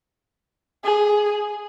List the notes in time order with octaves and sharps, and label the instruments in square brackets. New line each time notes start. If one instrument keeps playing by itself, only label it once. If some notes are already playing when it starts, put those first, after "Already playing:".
[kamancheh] G#4